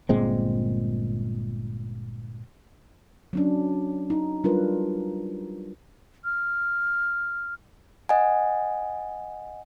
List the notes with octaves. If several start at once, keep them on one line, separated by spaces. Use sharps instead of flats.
G1 A#2 G#3 C4
F#3 C#4 D4
D#4
F#3 G3 D4 F4 A#4 B4
F6
D#5 F#5 G#5